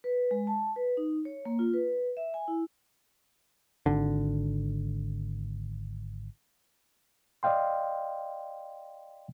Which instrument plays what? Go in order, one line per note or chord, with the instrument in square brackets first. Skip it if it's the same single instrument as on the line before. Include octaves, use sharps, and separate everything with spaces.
[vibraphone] B4
G#3
A5
B4
D#4
C#5
A#3
F4
B4
E5
G#5
E4
[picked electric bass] G#1 D3
[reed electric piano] D5 D#5 F5 G5 C6